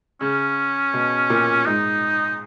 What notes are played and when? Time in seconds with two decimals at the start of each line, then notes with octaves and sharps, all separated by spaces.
0.21 C#3 C#4
0.94 B2
1.30 A#2
1.66 G#2 D#4